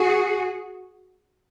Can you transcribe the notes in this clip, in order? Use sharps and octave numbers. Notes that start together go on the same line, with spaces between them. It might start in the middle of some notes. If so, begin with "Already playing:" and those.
Already playing: F#4 G#4